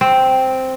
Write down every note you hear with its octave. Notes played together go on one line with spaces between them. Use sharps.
C4